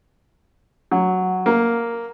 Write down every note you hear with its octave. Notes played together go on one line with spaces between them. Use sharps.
F#3
A#3